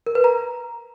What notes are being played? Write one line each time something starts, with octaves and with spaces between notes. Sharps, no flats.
A#4
B4
A#5